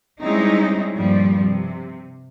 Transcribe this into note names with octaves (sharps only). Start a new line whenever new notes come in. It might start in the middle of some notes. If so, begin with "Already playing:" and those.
G3 G#3 C4 C#4 D#4 E4
G2 A#2 F3 G3
C3